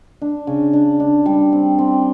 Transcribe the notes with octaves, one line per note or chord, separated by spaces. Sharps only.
D4
C#3
D4
D4
G3
C4
C4